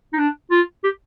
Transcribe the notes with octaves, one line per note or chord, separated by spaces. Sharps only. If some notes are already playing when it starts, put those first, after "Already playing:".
D#4
D4
F4
G4